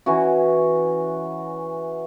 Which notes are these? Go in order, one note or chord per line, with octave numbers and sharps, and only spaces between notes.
E3 C#4 F#4